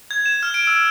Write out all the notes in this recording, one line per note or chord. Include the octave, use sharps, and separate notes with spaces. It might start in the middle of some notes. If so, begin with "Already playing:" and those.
G#6
E7
F6
D7
E6